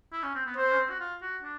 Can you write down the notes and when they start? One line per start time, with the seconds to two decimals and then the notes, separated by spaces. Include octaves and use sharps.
0.13 E4
0.23 C#4
0.35 C4
0.46 B3
0.57 C4 C5
0.72 C#4
0.79 C4
0.90 F#4
1.00 F4
1.22 F#4
1.43 D4